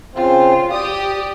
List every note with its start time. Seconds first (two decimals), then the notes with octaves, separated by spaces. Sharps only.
0.16 C#3 C4 F4 C5
0.73 G4 D5 D#6